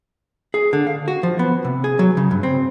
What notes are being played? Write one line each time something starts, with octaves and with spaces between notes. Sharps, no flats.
G#4
D3
F5
F#4
F3
B3
C3
G#4
F#3
C#3
G2
C4